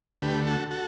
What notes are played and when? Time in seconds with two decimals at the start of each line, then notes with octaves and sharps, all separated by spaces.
0.22 D2 D3 A3 G4 B4
0.47 F#4 A4
0.71 F#4 A4